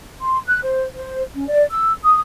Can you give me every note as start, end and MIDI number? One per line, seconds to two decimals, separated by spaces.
0.21 0.39 84
0.46 0.58 90
0.63 0.85 72
0.95 1.22 72
1.35 1.46 61
1.49 1.65 74
1.71 1.93 88
2.03 2.19 87